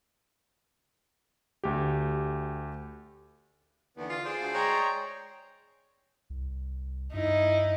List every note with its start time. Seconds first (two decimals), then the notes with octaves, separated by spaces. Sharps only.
1.64 D2 G4
3.97 D#2 D3 E3 B3
4.10 F4
4.25 G#4 C5 D5
4.41 D2
4.54 G#3 C#5 G5 A#5
6.30 C2
7.14 G2 D#4 E4